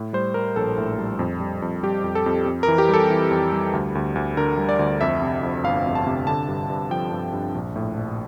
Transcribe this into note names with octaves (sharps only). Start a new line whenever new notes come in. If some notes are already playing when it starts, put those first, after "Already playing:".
Already playing: A2
G3 C5
G3 A#4
A#1 A4
A2
G3
F2
G3
F2
G3 G4
F2
A4
F2
F2
A#4
E3
G4
G3 A4
E3
F2
G3
D2
D2
D2
D3 A#4
G3
D5
D2
F2 E5
C3
F2
G1 F5
F2
A5
C3
D3 A5
G2
G2
F3 G5
G2
G2
A#1
A2
A#1